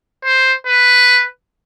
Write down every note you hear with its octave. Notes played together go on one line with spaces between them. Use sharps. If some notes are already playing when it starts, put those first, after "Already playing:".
C5
B4